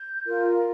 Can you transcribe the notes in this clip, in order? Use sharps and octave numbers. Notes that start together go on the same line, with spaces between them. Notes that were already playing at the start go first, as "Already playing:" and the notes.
Already playing: G6
F4 A#4